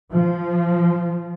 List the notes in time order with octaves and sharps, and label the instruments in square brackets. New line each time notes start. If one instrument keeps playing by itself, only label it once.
[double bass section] F3